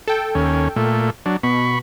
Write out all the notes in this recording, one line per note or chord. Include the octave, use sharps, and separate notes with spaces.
A4 G5
D#2 C#4
A#2 A3
F#3 D4
B2 B5 C#6